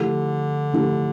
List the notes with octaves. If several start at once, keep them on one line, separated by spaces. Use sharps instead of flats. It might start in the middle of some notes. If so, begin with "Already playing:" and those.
Already playing: D3 F3 A3 E4 G4
F3 A3 E4 G4